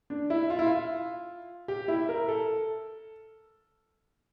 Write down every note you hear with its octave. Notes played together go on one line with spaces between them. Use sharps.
D4
E4
F4
E4
F4
G4
E4
A#4
A4